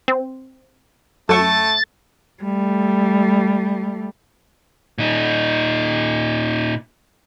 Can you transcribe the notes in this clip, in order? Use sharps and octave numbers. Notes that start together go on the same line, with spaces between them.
C4
F#2 A3 A4 C#6 A6
G3 A3
A#2 D#4